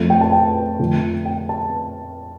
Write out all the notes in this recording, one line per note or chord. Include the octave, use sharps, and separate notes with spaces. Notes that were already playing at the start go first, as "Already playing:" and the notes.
Already playing: F2 F3 A3
G5
A5
G5
F2 D3 F3 A3
G5
A5